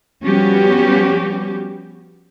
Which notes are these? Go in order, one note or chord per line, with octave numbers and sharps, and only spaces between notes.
F3 G3 B3 C#4 F#4 G4